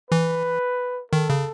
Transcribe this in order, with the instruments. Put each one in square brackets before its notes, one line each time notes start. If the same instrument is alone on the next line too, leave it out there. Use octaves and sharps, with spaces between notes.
[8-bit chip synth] E3 [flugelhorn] B4
[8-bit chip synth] D#3 [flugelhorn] A4
[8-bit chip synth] C#3